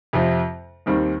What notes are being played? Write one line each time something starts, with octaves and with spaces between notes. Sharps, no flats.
F2 C3 F3
D#2 D#3 G3 C4